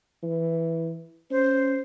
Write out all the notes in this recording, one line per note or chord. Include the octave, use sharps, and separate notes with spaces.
E3
C#4 C5